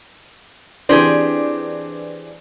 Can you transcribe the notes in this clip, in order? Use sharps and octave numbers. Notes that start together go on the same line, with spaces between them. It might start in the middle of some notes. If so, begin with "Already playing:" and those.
E3 C4 D4 G4 G#4